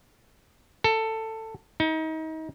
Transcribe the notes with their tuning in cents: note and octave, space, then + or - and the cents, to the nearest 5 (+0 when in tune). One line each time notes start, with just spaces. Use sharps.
A4 +15
D#4 +30